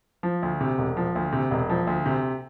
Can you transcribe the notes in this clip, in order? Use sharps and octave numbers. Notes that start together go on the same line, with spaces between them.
F3
D2
C3
E1
F3
D2
C3
E1
F3
D2
C3